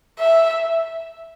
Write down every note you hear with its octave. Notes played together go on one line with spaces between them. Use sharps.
E5